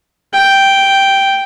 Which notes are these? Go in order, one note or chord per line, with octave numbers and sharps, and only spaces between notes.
G5